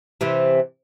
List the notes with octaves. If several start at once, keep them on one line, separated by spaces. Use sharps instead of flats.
C3 E3